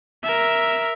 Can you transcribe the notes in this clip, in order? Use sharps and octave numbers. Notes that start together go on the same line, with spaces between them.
A#4 E5